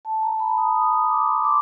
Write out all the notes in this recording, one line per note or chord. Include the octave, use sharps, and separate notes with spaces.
A5
A#5
B5
D#6
D#6
D#6
D6
C6
D6